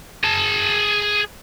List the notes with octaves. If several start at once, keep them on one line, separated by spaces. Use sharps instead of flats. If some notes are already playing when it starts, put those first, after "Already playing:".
G#4 A5